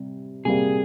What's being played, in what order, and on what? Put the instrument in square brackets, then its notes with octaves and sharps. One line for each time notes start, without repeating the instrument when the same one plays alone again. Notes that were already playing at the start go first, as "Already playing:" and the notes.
Already playing: [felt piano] C3 G3
[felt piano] C3 G3 A#3 [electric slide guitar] G#4